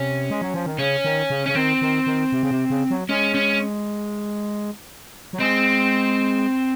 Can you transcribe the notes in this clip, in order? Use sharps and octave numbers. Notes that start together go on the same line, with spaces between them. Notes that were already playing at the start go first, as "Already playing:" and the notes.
Already playing: C3 C#4
G#3
F#3
F3
D#3
C#3 C#4
D#3
C#3
C#3 C#4
D#3 C4
D#3
D#3
C3
C#3
C3
C#3
F#3
G#3 C#4
C#4
F#3
G#3 C4